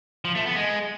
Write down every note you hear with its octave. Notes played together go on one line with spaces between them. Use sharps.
F3
A3
B3
G#3